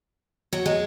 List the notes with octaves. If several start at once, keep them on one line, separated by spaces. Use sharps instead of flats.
F#3
G#3